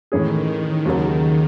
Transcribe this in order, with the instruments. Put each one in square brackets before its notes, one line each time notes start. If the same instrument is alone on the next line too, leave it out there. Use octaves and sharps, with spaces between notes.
[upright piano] A2 E3 G#3 C#4 G#4 [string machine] D#3
[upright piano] D#2 C#3 F#3